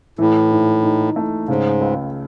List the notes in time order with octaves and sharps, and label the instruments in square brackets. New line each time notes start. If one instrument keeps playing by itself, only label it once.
[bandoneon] A2 [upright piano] E3
[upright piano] G#2
D#4
A3
[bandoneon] G#2 [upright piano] C#3
[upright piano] C#2